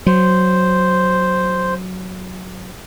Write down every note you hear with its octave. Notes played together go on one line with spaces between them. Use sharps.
F#3 C5